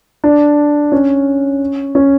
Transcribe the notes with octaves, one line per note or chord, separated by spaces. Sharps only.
D4
C#4
C#4